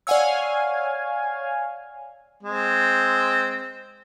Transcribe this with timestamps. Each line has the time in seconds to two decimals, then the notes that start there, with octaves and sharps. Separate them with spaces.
0.07 C#5 D5 F5 F#5 G#5 E6
2.43 G#3 C4